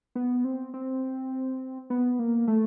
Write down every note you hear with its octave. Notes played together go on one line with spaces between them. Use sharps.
B3
C4
C4
B3
A#3
A3